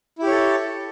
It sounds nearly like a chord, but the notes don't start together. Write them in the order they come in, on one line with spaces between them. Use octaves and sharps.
E4 G4 C#5 A4